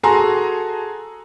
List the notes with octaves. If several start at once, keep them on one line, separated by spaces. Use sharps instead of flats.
F#4 G#4 A4 G#5 A#5 C6